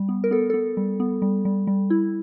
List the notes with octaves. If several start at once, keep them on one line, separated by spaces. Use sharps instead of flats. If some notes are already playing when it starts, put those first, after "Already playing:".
Already playing: G3
B3
A#4
B3 A4
B3 A4
G3
B3
G3
G3
G3
E4